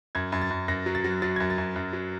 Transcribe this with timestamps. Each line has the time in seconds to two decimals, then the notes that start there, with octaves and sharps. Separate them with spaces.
0.15 F#2 G#6
0.32 F#2
0.42 A6
0.50 F#2
0.68 F#2 A#6
0.86 F#3
0.95 A6
1.04 F#3
1.22 F#3 A6
1.36 F#2 G#6
1.50 A6
1.58 F#2
1.76 F#2
1.93 F#3